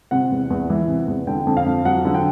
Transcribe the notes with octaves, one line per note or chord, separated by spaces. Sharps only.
C3 F#5
E2
E2
E3
C3
E2
D3 G5
F2
F5
F2
F#3 F#5
D3
G5